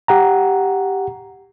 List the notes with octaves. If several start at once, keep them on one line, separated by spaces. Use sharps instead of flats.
G4 F#5 A#5